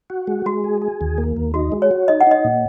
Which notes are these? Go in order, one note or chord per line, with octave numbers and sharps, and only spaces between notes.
F#4
G#3
G#3 F#4
G#4
G#4
D#2
A#3
D#2
D#4 F#4
G#3
C#5
F#4
D#4 D#5
F#5
D#4 D#5
A#2